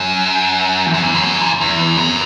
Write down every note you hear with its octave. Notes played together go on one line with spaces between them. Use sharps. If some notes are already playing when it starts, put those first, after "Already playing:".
Already playing: F#2
E2
F#2
E2
F#2
E2
E2
F#2